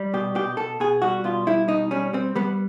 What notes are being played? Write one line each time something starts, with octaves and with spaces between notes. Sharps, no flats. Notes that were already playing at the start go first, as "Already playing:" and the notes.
Already playing: G3
B2 G4
B2 G4
B2 A4
B2 G#4
G3 F#4
B2 F4
G3 E4
B2 D#4
G3 C#4
G3 C4
G3 B3